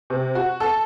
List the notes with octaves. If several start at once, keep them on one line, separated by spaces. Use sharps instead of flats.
C3
F#4
A4